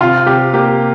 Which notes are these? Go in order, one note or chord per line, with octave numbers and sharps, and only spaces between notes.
C3 F4
C3 G4
A#3 G4